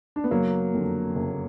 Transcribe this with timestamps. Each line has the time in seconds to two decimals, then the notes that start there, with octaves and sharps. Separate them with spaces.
0.16 D4
0.24 B3
0.31 F#1 F#3 A#3
0.74 F2 D3
1.15 F#1